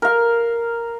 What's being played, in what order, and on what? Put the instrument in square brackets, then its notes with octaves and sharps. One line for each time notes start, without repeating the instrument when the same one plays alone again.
[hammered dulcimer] A#4 F5